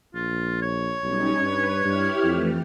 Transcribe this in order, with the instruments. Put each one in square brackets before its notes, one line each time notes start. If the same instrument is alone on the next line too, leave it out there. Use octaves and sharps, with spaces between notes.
[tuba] A#1 [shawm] F4
[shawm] C#5
[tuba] B1 [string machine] G3 C#4 D#4
[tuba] G2 [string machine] B4
[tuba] G2 [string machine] E4 G4 F6
[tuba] F2 [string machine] E3 A3